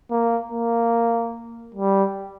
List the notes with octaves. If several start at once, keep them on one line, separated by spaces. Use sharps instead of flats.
A#3
A#3
G3